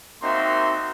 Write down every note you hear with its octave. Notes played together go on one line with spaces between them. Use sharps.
A#3 C4 D#4 F#4 E5 C6